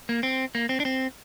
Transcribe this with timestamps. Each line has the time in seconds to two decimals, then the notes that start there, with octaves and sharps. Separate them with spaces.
0.09 A#3
0.23 C4
0.55 A#3
0.69 C4
0.80 D4
0.85 C4